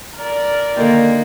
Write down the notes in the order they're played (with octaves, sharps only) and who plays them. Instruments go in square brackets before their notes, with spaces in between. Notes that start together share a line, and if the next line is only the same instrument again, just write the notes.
[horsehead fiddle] A#4 D5
[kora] D3 D#3 G4 [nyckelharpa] A#3